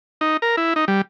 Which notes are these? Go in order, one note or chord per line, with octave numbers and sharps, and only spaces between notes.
D#4
A#4
E4
D#4
G3